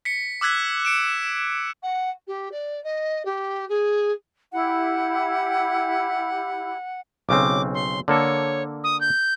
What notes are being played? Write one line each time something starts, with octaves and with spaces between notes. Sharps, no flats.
B6 C#7
D6 E6 F#6 G#6 B6
C#7 D7 E7
F#5
G4
D5
D#5
G4
G#4
E4 G4 F#5
B1 C#3 C4 D6
C6
D3 A#3 A4 C#5
D#6
G6